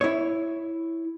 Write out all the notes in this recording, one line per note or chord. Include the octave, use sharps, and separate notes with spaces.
E4 C#5